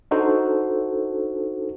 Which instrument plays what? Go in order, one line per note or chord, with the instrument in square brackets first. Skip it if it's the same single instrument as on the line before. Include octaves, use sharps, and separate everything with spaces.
[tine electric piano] D4 D#4 F#4 A4 C5